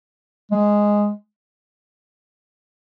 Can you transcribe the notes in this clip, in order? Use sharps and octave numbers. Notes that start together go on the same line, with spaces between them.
G#3